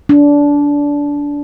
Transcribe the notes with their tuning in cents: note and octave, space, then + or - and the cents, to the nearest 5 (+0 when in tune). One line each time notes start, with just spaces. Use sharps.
D4 -20